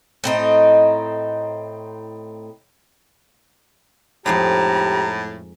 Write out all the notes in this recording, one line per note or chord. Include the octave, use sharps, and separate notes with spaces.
A2 C4 D#4
F2 A2 G#3 D#4 G4 A#5